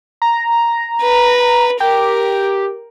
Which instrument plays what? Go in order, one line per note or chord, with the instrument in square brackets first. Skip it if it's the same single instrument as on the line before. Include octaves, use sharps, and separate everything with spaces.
[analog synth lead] A#5
[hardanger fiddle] B4
[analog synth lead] G4 [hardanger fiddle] A#4